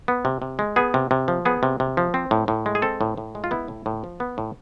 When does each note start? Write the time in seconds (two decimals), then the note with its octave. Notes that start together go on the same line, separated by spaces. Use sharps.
0.08 B3
0.25 C3
0.42 C3
0.59 G#3
0.76 B3 G#4
0.94 C3
1.11 C3
1.28 F3
1.45 B3 G#4
1.63 C3
1.80 C3
1.97 F3
2.14 C4
2.31 A2
2.48 A2
2.66 G#3
2.75 G#4
2.82 C4 A4
3.01 A2
3.17 A2
3.35 G#3
3.44 F4
3.51 B3 E4
3.68 A2
3.86 A2
4.04 F3
4.20 B3
4.38 A2